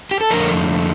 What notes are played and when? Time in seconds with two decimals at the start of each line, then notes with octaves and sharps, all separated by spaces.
0.11 G4
0.21 A4
0.30 F2 D3 F3 A3 A#4